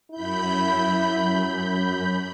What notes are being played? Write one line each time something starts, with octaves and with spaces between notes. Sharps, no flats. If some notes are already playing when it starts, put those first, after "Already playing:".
F#2 E4 B5 G6